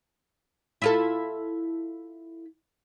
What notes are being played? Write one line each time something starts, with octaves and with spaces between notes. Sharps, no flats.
E4 F4 A4